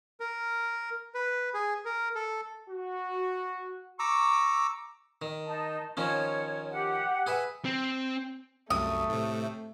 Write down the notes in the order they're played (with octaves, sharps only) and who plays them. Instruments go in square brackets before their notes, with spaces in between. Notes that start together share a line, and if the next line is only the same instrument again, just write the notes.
[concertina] A#4
B4
G#4
A#4
A4
[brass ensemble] F#4
[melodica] A#5 D6 E6 [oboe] C#6
[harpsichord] D#3
[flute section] D#4 A5
[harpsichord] D#3 F3 C#4 [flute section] C#5
[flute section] G4 F#5
[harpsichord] G#4 B4 E5
[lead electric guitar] C4
[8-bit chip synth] C2 F#2 [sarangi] A3 [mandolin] D#6
[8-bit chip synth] A2 C3